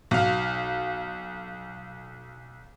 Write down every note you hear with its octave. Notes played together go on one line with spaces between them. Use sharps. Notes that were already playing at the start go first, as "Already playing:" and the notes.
B1 F5